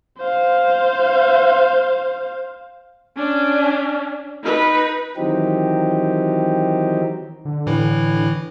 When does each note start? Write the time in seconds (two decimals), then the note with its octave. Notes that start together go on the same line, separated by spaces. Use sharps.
0.18 C5 F5
3.16 C#4 D4
4.43 D#4 B4
5.17 D#3 E3 F#3 C4 D#4 G4
7.45 D3
7.67 A2 E3 E4